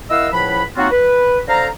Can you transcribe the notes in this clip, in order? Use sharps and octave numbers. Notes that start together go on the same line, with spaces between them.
E4 A#4 D#5 F5 F#5 E6
C#2 A2 F3 E4 F#5 B5
F#3 A#3 C4 D#4 F4 F#4
B4
D3 A4 C5 F5 A#5